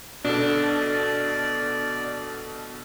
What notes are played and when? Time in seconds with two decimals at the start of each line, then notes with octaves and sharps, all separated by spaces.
0.25 B2 D4 A4 D5